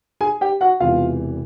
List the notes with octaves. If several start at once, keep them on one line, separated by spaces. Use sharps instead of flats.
G#4 G#5
G4 G5
F#4 F#5
E1 E2 C3 E3 F4 F5